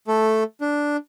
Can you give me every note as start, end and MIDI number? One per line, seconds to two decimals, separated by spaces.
0.08 0.43 57
0.08 0.43 69
0.61 0.97 62